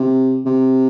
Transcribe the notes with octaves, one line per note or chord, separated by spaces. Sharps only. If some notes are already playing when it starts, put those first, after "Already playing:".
Already playing: C3
C3